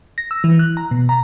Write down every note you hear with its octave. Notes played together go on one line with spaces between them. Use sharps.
A#6
E6
E3
F#6
A#5
B2
A#5